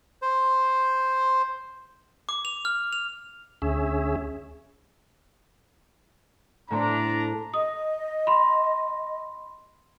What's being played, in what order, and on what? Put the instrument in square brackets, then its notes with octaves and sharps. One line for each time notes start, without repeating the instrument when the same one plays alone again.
[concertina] C5
[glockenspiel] D6
F7
F6
F7
[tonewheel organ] D2 C#4 G#4 E5
[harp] A2 A3 C4 [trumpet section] D4 A#5
[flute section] D#5 [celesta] D#6
[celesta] B5 C6